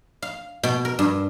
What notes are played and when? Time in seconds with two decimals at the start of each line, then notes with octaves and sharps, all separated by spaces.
0.22 F5
0.63 B2
0.85 A#4
0.99 G2